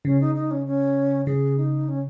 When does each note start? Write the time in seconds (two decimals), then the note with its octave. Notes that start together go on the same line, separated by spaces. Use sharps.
0.05 C#3 C#4
0.21 D#4
0.35 D#4
0.51 C#4
0.66 C#4
1.26 C#3 G#4
1.58 D#4
1.88 C#4